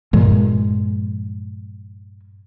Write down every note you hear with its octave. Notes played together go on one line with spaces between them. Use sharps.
G2 A#2 F3 G#3